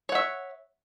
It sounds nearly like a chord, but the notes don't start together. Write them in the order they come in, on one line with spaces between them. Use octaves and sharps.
C#5 F#5 E5